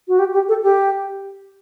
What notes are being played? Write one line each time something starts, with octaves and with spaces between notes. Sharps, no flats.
F#4
G4
G4
A4
G4